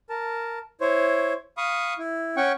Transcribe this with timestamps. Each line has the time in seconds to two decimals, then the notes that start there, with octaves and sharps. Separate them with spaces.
0.10 A#4 A5
0.81 E4 C5 C#5
1.57 F5 B5 C#6 D#6
1.98 E4
2.37 C#4 F#5 G5 C#6